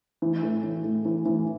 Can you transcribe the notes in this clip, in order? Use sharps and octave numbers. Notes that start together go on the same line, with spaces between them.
E3
A2
E3
A2
E3
E3